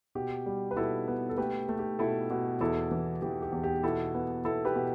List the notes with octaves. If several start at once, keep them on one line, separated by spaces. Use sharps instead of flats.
B2 G4
G3
B4
B2 E4 A4
B3
A4
A3 G4 B4
A3
G4
B2 E4 A4
B2
E2 E4 A4
E3
E3 G4
G4
E2
G4
B2 E4 A4
B3
B3 E4 A4
G4 B4
B2